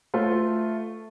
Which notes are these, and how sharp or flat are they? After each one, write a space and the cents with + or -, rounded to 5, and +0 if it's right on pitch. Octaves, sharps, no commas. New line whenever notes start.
A3 +0 F4 +0 C5 -40